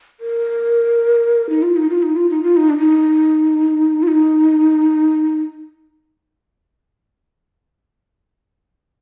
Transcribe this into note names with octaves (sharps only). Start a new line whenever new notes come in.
A#4
D#4
F4
D#4
F4
D#4
F4
D#4
F4
D#4
D4
D#4
F4
D#4